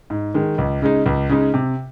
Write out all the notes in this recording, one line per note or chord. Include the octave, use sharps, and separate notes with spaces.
G#2
D#3 G#3
C#2
C#3 G#3 D#4
C#2
C#3 G#3 D#4
C3